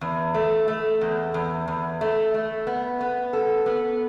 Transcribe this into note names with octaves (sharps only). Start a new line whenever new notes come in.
E2
A3
A3
E2
E2
E2
A3
A3
B3
B3
A4
B3